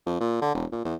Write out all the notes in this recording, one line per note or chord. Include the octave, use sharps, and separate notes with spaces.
F2
A#2
D3
E1
A#2
E2